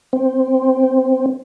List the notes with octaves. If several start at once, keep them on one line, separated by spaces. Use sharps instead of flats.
C4